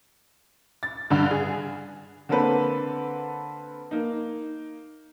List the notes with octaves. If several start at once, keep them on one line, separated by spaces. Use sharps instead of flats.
A6
G2 D3
G#4
D3 A#3 C4 A4 B4
A#3 D#4